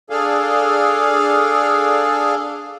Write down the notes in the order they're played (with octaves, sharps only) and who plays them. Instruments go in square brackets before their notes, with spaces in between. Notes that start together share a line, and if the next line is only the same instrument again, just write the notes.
[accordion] D4 G#4 A4 F5